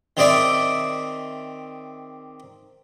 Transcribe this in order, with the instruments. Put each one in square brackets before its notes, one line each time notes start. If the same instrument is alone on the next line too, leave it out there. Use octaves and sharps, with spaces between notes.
[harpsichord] D#3 C4 G#4 D5 E5